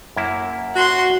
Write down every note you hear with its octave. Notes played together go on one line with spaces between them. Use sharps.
F#2 A#3 E4
F#4 F#5 C6